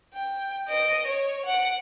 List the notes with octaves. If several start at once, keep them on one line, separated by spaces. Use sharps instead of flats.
G5
D#5 D7
C#5
F#5 D7